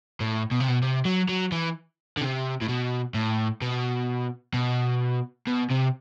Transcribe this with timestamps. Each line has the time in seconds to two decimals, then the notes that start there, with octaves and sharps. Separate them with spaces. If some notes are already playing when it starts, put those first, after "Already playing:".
0.20 A2
0.51 B2
0.60 C3
0.68 B2
0.82 C3
1.05 F#3
1.29 F#3
1.52 E3
2.17 D3
2.21 C3
2.61 A2
2.68 B2
3.14 A2
3.62 B2
4.54 B2
5.47 B2
5.70 C3